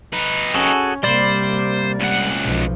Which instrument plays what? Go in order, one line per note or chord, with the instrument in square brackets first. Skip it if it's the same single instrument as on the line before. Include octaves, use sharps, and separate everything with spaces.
[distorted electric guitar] D#4 B4
[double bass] C#4 [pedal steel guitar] F#4 G#4 A4
[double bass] C3 A#3 [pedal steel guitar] G3 D5 B5 [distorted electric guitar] C5
[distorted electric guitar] C#2 F#5
[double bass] B1 F3